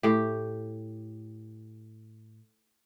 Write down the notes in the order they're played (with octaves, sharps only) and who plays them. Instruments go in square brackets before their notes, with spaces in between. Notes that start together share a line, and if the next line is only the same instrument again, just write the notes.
[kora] A2 G4